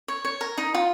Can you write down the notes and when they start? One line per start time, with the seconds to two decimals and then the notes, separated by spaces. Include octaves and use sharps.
0.08 C#5
0.25 C#5
0.41 A#4
0.58 D#4
0.74 F4